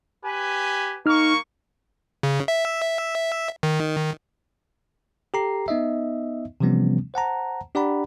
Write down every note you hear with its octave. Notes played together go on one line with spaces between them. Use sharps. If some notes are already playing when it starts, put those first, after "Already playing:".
G4 B4 G#5
A#3 D#4 C#6 F6
C#3
E5
D#3
G4 A4 A#5 C7
B3 D#4 D#5 E5
C3 E3 F3 G3 B3 C#4
C5 F#5 A5 A#5
D4 G4 D5 F#5 A#5 B5